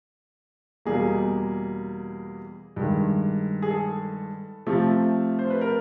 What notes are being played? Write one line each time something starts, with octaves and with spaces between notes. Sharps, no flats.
E2 B2 G3 A#3 G#4
G2 D#3 G#3
G#4
A4
C3 F3 A3
C5
B4
A#4